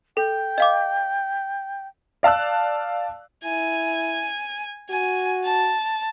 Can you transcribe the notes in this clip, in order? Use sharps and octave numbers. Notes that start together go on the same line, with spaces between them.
A4 G5
D#5 F5 D6
D5 F5 A5 E6 F#6
E4 G#5
F#4 G#5
A5